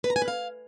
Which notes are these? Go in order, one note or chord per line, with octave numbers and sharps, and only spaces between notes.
B4
A#5
G#5
B4
F5